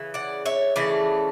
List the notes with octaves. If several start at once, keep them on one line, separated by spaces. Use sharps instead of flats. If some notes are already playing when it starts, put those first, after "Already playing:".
Already playing: C#3 E3
D5 F#5
C#5 E5
C#3 E3 A3 D5